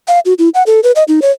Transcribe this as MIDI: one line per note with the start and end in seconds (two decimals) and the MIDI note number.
0.08 0.20 77
0.25 0.34 66
0.39 0.49 64
0.54 0.63 78
0.66 0.80 69
0.83 0.92 71
0.96 1.04 75
1.08 1.20 63
1.22 1.31 73